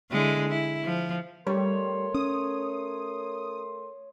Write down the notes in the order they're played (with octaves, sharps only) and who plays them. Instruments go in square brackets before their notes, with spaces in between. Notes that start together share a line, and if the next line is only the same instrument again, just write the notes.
[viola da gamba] D3 G#3 E4
E4
F3
[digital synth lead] G3 [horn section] A3 A#4 C6 [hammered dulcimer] C#5
[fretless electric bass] C#4 [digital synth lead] D#6